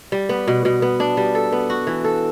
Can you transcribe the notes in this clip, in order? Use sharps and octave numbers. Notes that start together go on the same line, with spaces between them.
G3
B3
B2
B2
B3
D4
G3
A4
B3
F#4
E3
A4